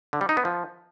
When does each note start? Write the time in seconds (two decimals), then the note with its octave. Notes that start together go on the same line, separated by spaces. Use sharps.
0.13 D3
0.21 G3
0.29 D#4
0.37 B3
0.45 F3